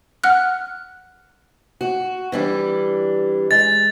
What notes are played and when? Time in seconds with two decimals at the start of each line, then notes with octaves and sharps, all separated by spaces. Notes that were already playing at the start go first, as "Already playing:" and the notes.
0.24 F#5 F6 F#6
1.81 F#4
2.32 E3 G3 D4
3.51 G#3 A6